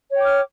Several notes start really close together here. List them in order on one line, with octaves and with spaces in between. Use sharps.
C#5 G5 D6 F6